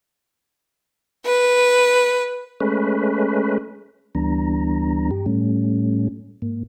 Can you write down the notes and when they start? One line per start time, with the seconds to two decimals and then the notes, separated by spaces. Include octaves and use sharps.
1.25 B4
2.60 G#3 A3 C#4 B4
4.15 D2 E3 G3 B3 D4 A#5
5.11 G2 G4
5.26 A2 G3 A3 C#4
6.42 G#2 A#3